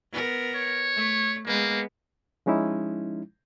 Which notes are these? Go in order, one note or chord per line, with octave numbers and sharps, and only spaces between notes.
B3 A#4
C#5
A3
G#3 A#3 B3
F3 G#3 C#4 D#4 E4